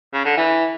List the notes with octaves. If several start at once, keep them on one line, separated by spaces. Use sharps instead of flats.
C#3
D3
E3